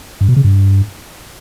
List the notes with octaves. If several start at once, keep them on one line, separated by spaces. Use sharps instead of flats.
G2
B2
C#3
G2